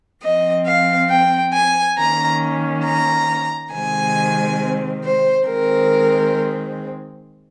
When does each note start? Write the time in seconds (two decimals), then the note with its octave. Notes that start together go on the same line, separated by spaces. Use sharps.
0.23 F3 C4 D#5
0.66 F5
1.10 G5
1.54 G#5
1.98 D#3 A#3 C#4 A#5
2.86 A#5
3.73 C3 D#3 G#3 C4 G#5
5.04 C5
5.47 D#3 G#3 C4 A#4